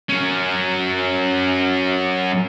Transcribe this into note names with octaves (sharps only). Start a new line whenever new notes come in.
F#3 C#4